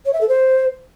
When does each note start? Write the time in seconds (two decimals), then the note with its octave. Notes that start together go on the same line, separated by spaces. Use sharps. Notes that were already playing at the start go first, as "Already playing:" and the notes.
0.05 C#5
0.13 E5
0.20 A4
0.28 C5